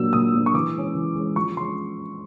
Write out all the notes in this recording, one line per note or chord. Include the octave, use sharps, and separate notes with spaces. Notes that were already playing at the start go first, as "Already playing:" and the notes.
Already playing: A#2 F#3 A#3 D4 E6
A#2 D#6
F#3 A#3 D4
C#6
E3 D6
G#3 C#4
E3
G#3 C#4
F3 C#6
G#3 C#4 C6